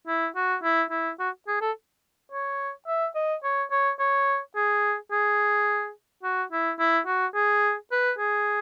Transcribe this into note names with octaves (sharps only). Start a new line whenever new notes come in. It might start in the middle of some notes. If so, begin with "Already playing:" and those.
E4
F#4
E4
E4
F#4
G#4
A4
C#5
E5
D#5
C#5
C#5
C#5
G#4
G#4
F#4
E4
E4
F#4
G#4
B4
G#4